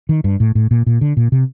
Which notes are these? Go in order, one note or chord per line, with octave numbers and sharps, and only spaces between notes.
D#3
G2
A2
A2
A#2
A#2
D3
A#2
C3